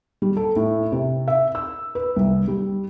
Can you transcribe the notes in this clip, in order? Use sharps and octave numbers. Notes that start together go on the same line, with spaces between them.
G3
A4
A2
C3
E5
E6
B4
C2
G3